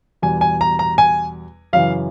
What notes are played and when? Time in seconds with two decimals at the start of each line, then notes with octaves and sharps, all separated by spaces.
0.22 E2 B2 G3 G#5
0.41 G#5
0.61 A#5
0.79 A#5
0.98 G#5
1.73 F#2 C#3 E3 F5